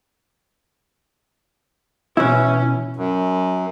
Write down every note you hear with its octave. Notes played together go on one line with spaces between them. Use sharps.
B2 E3 C#4 E4
F#2